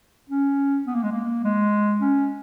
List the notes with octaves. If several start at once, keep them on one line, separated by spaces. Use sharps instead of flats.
C#4
B3
A#3
G#3
A#3
G#3
C#4